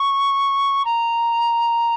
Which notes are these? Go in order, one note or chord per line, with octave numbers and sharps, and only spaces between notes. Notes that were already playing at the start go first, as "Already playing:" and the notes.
Already playing: C#6
A#5